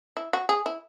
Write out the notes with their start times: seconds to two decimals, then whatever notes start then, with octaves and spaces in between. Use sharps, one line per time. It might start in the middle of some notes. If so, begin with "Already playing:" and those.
0.17 E4
0.33 F#4
0.49 G#4
0.66 E4